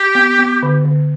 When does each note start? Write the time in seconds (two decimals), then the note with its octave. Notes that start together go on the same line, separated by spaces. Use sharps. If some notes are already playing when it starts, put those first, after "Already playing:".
Already playing: G4
0.15 B3
0.39 B3
0.63 D3
0.85 D3